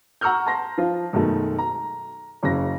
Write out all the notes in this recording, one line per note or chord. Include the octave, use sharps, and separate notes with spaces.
F#5 A#5 C#6 E6 F6 G6
A5 A#5 C6 A#6
F3 F4
F#2 B2 D#3 G#3 A3
A#5
F#1 C#3 A#6